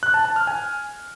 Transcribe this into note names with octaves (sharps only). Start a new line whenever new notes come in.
F#6
A5
A5
F6
G#5